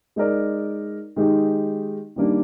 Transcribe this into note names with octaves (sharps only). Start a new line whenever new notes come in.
G#3 D#4 A#4 D5
D#3 G#3 D#4 G4
D#3 G3 A#3 D4